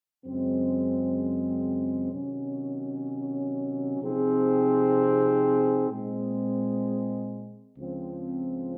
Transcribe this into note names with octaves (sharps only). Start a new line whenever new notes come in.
F#2 C#3 G#3 C4
C3 D#3 F#3 C#4
C3 F3 C4 D#4 G#4
A#2 G#3 C4
C#2 C#3 F3 C4